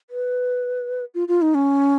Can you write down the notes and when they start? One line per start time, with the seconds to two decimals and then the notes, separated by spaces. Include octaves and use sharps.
0.10 B4
1.15 F4
1.28 F4
1.42 D#4
1.55 C#4